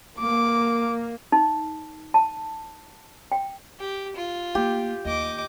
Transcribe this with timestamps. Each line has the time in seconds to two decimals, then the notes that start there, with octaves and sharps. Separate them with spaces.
0.19 A#3 D6
1.32 D#4
2.14 A5
3.32 G5
3.79 G4
4.16 F4
4.55 A#3 G4
5.05 D#2 D#5 D6